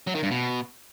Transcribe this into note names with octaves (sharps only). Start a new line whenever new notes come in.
F#3
D#3
G2
B2